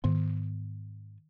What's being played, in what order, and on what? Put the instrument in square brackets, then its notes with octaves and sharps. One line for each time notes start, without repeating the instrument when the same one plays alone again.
[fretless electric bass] G#2 B3 [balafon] D#3